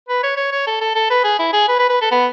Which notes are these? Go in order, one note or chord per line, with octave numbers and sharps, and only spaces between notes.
B4
C#5
C#5
C#5
A4
A4
A4
B4
G#4
E4
G#4
B4
B4
B4
A4
B3